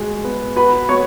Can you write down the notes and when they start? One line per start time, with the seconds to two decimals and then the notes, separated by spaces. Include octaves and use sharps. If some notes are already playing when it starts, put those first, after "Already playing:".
Already playing: G#3 F#4
0.25 B3
0.56 F#4 B4 B5
0.89 B3 C#5 C#6